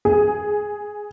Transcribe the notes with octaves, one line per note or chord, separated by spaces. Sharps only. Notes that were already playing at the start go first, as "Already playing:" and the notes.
G#4